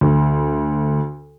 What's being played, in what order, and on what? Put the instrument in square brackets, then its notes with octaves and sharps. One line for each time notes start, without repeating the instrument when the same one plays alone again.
[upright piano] D2